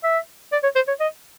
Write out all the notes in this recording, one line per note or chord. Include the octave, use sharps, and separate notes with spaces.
E5
D5
C#5
C5
C#5
D#5